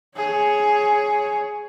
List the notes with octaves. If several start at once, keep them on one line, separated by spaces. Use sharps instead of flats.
G#4 C#5